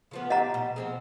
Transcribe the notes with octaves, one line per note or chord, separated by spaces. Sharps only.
C#3 F3 B3
G4 D#5 F#5 A#5
B2
F3 C4 G#4